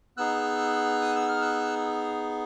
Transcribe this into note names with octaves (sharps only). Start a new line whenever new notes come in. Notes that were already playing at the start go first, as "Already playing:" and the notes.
B3 D#4 G#4 E6 F#6
D#6
E6
F6
E6 F#6